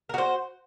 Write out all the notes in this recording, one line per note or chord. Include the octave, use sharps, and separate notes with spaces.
F#4 A#4 C5